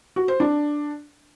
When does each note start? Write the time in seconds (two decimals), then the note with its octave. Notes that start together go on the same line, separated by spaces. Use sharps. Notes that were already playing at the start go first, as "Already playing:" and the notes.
0.16 F#4
0.28 C5
0.40 D4